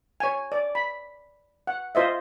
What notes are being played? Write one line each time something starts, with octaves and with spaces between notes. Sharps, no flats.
C#5 G#5
D5
B5
F#5
F4 C5 D#5 E5